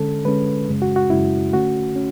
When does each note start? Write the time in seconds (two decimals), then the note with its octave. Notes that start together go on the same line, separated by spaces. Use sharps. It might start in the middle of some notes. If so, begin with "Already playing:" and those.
Already playing: D3 G#3 C#4 A4
0.25 D3 G#3 C#4 B4
0.68 F#2 C#3 G#3 C#4
0.82 F#4
0.96 F#4
1.10 F#2 C#3 G#3 C#4 E4
1.53 D3 A3 C#4 F#4
1.96 C#4